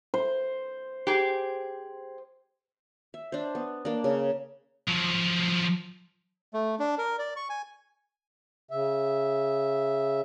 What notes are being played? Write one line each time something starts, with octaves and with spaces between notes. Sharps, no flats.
C5
G4 G#4
E5
D4 C5
B3
A#3 D4
C#3
F3 F#3
A3
D4
A#4
D5
C#6
G#5
C#3 E5